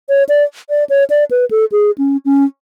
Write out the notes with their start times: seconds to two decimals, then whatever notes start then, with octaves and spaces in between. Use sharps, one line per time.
0.09 C#5
0.29 D5
0.70 D5
0.89 C#5
1.10 D5
1.31 B4
1.51 A4
1.72 G#4
1.98 C#4
2.25 C#4